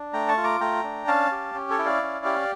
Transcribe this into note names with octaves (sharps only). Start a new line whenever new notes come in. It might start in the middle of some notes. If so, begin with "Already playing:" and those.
Already playing: D4
A3 G5 A#5
A5 C#6
F4
A#5 D6
A3 G5 A#5
D4
C#4 F5 A5
G4
C#4
A4 C#5
E4 G5
D5 F5
C#4
G4